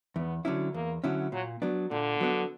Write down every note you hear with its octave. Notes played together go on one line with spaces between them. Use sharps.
E2 B3
D3 F#3 C#4 E4
E2 A#3
D3 F#3 C#4 E4
A#2 F#3
F#3 B3 D4
A#2 D3
F#3 B3 D4